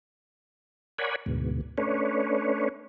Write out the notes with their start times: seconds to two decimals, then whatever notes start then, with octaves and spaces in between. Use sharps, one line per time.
0.99 A#4 C#5 D5 F#5 G#5 B5
1.26 D2 G#2 B2
1.78 A3 C#4 D4 B4 C#5